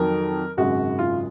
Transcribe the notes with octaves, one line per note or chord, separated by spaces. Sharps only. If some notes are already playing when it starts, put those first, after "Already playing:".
Already playing: F2 D#3 F#3 A#4
G#1 F#2 C#3 G#3 F#4
F4